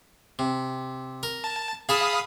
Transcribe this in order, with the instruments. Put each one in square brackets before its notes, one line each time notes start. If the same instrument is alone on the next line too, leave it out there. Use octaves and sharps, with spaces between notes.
[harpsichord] C3
A#4
[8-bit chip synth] A5
[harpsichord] G#4 A4 A5 [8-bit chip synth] F5 B5 D#6